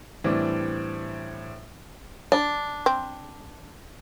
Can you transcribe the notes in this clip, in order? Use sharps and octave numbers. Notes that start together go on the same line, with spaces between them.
A2 E3 G3 C4 D4
D4
C4